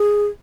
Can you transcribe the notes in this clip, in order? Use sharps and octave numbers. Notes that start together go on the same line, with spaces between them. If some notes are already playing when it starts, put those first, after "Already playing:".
Already playing: G#4